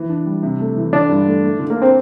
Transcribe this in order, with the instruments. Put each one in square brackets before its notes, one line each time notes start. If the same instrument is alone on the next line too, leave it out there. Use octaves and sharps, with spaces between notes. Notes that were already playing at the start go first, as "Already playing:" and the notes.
Already playing: [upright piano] E3
D4
G3
C3
A3
E3
[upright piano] D3 [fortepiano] D4
[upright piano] G2
A3
A3
D3
[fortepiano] A#3
[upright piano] D4
[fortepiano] C4